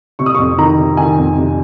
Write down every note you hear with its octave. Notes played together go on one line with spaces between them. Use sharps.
C3 C#6
D#6
F2 C#6
D#3 A#5
C3
D#3 G#5
F2
C3